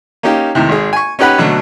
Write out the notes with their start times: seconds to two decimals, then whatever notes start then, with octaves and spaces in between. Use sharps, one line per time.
0.23 A#3 C#4 D#4 G4
0.55 D#2 A2 C3
0.69 G#1 G#4
0.93 G#5 C#6
1.19 C#4 D#4 G4 B4 F#5 B5
1.38 B2 D3 F#3 A3